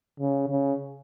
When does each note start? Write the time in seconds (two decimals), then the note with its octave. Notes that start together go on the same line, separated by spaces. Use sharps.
0.20 C#3
0.48 C#3